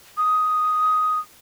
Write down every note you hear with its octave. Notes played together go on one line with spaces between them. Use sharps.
D#6